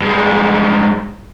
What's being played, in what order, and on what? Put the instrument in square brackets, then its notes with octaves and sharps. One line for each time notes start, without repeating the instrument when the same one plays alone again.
[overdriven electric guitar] G2 G#3